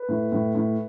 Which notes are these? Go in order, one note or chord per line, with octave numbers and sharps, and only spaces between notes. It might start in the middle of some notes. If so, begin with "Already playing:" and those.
Already playing: B4
A2
A2
A2